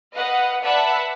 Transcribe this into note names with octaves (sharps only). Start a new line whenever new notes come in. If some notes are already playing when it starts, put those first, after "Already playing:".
B4 D#5 F5 F#5
B4 D5 E5 F#5 A5 B5